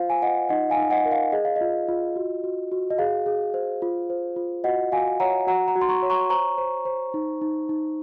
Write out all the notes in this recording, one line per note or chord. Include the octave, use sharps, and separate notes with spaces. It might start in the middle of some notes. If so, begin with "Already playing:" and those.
Already playing: F4 C5 F5
G#5
F4 D#5 F#5
D#4 D#5 F#5
F5 G#5
D#4
D#5 F#5
A#4
F5
G#4 D#5
F5
F4 D#5
F4
F#4
F#4
F#4
D#5
G#4 F5
G#4
C5
F4
C5
F4
F#4 D#5 F#5
F#4 F5 G#5
C#5 F#5 A#5
F#4 F#5 A#5
F#5 A#5
F#4
C6
A#5 C#6
C#5
A#5 C#6
C5 A#5 C#6
C5
C5
D#4
D#4
D#4